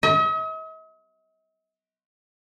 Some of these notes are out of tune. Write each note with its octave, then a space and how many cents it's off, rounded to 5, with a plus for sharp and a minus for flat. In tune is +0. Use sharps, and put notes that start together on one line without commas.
D#5 +45